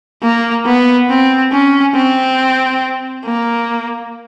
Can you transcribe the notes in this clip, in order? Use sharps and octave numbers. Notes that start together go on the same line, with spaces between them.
A#3
B3
C4
C#4
C4
A#3